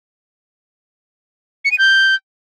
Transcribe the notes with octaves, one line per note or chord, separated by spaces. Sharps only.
C#7
D#7
G6